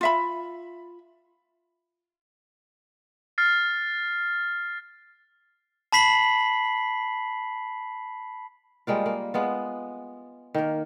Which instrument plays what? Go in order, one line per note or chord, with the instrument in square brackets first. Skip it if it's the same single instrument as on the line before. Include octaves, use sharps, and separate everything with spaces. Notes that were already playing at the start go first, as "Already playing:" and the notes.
[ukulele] F4 E5 B5
[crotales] F6 A6 C7
[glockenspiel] A5 B5 B6 C7 F#7
[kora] G3 G#3 A#3 F4
A#3
G#3 B3 F4
D#3 A#3